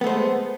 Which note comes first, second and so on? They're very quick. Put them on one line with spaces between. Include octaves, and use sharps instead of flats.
B3 A3 C5 G#3